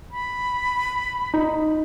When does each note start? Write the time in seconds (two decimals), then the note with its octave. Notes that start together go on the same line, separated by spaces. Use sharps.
0.11 B5
1.34 D#4